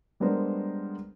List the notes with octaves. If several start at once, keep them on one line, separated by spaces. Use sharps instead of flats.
G3 G#3 B3 D4 A#4 C5